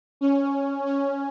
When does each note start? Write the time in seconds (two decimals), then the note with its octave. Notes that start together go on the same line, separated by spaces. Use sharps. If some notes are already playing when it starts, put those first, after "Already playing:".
0.21 C#4
0.86 C#4